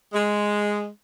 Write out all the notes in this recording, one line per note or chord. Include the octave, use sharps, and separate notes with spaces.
G#3